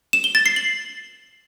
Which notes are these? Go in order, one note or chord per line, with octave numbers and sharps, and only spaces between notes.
E7
G7
A6
C7
F#7